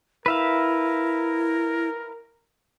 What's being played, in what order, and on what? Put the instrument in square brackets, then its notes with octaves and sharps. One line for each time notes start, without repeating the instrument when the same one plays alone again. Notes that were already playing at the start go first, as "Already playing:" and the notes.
[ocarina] E4 [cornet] A#4 [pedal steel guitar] B4 E5 F5